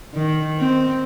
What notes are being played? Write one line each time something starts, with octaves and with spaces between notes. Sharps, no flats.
D#3
C4